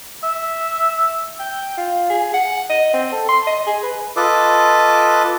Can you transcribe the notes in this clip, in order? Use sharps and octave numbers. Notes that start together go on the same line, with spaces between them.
E5
G5
F4
G#4
F#5
D#5
C4
A4
C6
D#5
G#4
B4
F4 A4 B4 D#5 D6